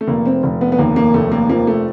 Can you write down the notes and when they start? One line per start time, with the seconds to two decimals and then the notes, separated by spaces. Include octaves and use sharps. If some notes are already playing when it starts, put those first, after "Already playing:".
0.01 A3
0.07 F1 A#3
0.26 C4
0.43 F1
0.61 B3
0.72 B3
0.78 D#2 A#3
0.96 A#3
1.14 F1 A3
1.32 A#3
1.49 F3 A#3
1.67 A3